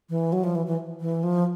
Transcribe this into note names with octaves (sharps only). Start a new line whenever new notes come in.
E3
F#3
F3
E3
E3
E3
F3